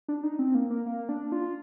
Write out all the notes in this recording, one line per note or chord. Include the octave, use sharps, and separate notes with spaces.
D4
D#4
C4
A#3
A#3
A#3
D4
F4